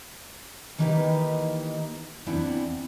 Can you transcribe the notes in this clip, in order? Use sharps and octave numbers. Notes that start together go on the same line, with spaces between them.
D#3 E3 A#3 D#4 G4 B4
E2 C4 D4 E4 F#5